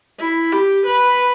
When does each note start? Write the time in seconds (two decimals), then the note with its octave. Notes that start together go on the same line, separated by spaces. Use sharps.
0.20 E4
0.53 G4
0.86 B4